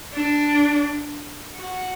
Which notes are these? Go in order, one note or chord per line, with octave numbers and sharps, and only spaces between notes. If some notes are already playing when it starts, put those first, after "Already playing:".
D4
F#4